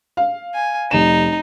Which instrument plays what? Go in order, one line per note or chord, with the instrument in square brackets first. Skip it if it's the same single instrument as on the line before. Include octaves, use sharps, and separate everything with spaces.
[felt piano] F5
[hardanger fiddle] G#5
[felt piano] F1 E7 [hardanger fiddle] D#4